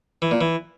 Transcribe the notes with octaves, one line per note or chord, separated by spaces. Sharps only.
E3
A#2
E3